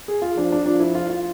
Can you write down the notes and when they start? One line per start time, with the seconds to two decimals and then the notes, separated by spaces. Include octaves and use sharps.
0.08 G#4
0.22 F4
0.36 F3 D4
0.52 D4
0.65 F3 D4
0.80 E4
0.95 F4
1.10 F4